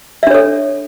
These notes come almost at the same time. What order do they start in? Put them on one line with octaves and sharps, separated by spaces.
E5 D4 C#5 A4